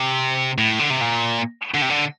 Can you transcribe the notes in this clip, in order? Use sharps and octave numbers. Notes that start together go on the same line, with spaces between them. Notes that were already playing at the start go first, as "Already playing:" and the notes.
Already playing: C3
A2
D3
C3
A#2
D3
C3
D3